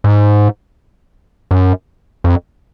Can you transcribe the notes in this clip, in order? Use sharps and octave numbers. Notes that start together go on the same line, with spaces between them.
G#2
F#2
F2